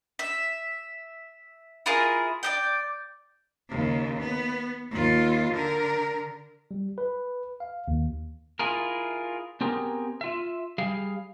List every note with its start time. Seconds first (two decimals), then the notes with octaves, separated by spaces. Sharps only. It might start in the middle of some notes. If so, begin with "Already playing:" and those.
0.19 E5
1.86 E4 F4 G#4 A#4
2.43 D5 D#5 G5
3.69 D#2 C#3
4.19 B3
4.91 D#2 F4
5.53 D3 A#4
6.71 G3
6.98 B4
7.60 F5
7.88 D#2
8.59 E4 F4 G#4 A#4
9.61 B3 C4 G4 G#4 A#4
10.21 F4 E5
10.78 G3 G#4 F5